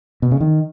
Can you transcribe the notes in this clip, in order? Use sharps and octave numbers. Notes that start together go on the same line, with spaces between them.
B2
C#3
D#3